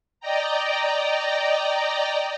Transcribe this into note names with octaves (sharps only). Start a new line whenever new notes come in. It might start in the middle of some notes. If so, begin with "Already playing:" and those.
D5 D#5 G5 A#5